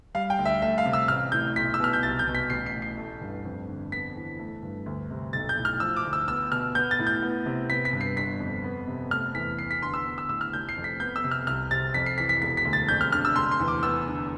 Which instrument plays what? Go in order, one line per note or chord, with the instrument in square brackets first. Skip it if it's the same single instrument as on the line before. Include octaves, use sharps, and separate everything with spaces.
[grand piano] G3 F5
G5
D2
E5
A3 E5
F5
C3
E6
A1 F6
A2 G6
B1 B6
E6
B2 F6
G6
C2 A6
G6
B2
B6
A1 C7
C7
A2
C7
A3
G2
F2
D3
B3 B6
E3
A3
G2
D2
C3
B1 A6
G6
A2
F6
F3 E6
D6
D2
E6
B3 E6
B2 F6
B3 G6
A6
A2
G6
B3
C3
B3 B6
B6
G2
C7
G1 B6
F2
B3
C3
A3 F6
E2 B6
B3 C7
B6
D3 C6
E6
B3
E6
A2 E6
F6
F1 G6
C7
F2
B6
B3 G6
E6
C3
F6
C2 F6
C3 A6
F2 B6
C7
E3 B6
B6
E1 B6
B6
D2
A6
F2 G6
F6
D3 F6
E6
F1 C6
C6
E2
D6
B3 E6
D3